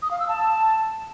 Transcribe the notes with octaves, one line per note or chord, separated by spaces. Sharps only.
D#6
F5
E6
A5